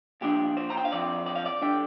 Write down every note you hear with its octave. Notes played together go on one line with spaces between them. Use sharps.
A#2 F3 D4 F4 G4
C5
A#5
G5
F5
F2 F3 C4 D5
D5
F5
D5
D3 G3 D4 G5